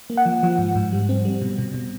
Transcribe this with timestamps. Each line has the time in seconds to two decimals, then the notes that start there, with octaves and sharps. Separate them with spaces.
0.10 A#3
0.17 F#5
0.25 F3
0.43 F3
0.58 G#2
0.75 G#2
0.92 G3
1.09 C4
1.25 G3
1.42 B2
1.59 B2
1.74 B2